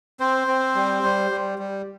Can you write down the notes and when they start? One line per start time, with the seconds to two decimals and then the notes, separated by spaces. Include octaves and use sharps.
0.20 C4 C5
0.47 C4
0.75 G3
1.03 G3
1.31 G3
1.58 G3